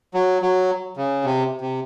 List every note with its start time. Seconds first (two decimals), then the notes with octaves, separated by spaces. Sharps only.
0.14 F#3
0.42 F#3
0.97 C#3
1.24 C3
1.61 C3